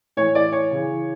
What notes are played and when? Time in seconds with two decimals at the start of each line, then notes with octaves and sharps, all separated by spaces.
0.17 A2 E3 C#5
0.35 D5
0.52 C#5
0.71 C#3 E3